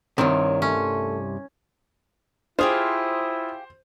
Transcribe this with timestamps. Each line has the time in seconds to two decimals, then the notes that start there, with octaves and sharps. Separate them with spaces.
0.18 C2 G2 C3 D#3 C#5
0.62 A3 C#4
2.59 E4 F4 G4 G#4 C5 F5 D#6